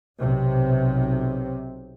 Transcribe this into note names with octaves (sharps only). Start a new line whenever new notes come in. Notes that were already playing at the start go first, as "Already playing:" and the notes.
B1 C3